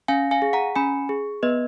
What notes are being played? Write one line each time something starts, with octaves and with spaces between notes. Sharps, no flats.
C#4 F5 G#5
F5 G#5
G#4
F#5 A#5
C#4 G#5 B5
G#4
B3 B4 D#5